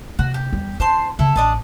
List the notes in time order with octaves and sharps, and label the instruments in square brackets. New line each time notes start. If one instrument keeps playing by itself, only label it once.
[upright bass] C3 A#3 [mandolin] F#4
[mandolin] G4
[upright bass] E2 G3
[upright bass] C4 E4 [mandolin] C5 A5 C6
[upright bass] C#3 A#3 [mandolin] E4 A4
[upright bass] A1 [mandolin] D4 D#5 A5